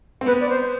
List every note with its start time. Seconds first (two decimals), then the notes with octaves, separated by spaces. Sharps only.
0.21 C4
0.26 B3 B4
0.41 D5
0.49 C5